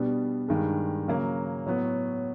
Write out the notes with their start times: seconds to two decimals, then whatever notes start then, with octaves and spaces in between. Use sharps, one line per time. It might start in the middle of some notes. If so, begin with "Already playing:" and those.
Already playing: B2 G3 B3 D4
0.48 G2 D#3 G#3
1.08 C#3 F#3 A#3
1.66 A2 F#3 B3